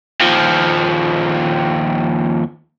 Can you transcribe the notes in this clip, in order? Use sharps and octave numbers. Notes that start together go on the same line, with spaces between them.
D#2 F3